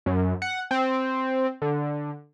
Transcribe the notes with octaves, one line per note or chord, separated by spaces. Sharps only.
F#2
F#5
C4
D3